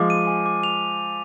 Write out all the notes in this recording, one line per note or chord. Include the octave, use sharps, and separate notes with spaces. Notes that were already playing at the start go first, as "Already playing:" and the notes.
Already playing: F3 G#3 D6
D#7
G#5
D6
F7